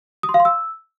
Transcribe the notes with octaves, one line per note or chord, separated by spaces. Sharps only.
D#6
C6
F5
C6
E6